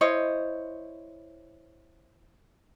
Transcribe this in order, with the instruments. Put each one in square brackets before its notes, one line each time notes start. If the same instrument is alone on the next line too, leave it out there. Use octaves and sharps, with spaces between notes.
[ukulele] E4 C5 C#5 D#5